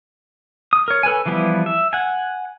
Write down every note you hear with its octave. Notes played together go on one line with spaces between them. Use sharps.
D#6
A#4 C#5
A4 B4 C#5 G#5
E3 F3 G3 B3 E4
E5
F#5 G#5